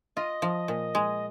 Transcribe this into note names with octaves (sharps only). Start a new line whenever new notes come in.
F4 D#5
F3
A#2
G#3